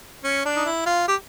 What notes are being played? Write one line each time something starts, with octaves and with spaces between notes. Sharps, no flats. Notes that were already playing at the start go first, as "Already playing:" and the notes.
C#4
D4
D#4
E4
F4
G4